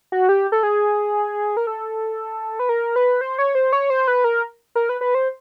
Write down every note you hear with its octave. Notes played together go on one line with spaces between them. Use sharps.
F#4
G4
A4
G#4
A#4
A4
B4
A#4
B4
C5
C#5
C5
C#5
C5
B4
A#4
A#4
B4
B4
C5